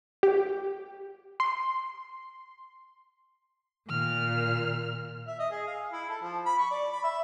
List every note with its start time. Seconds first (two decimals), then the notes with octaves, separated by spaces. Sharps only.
0.23 G4
1.40 C6
3.89 A#2 D#3 F6
5.27 E5
5.39 D#5
5.51 G#4
5.67 F5
5.93 E4
6.09 A4
6.22 F3
6.46 B5
6.58 C#6
6.71 D5
6.92 B5
7.04 E5